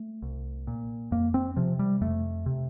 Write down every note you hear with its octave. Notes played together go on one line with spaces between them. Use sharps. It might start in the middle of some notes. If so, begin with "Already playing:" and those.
Already playing: A3
C2
A#2
F2 A#3
C4
C3 F3
G3
F2 A3
C3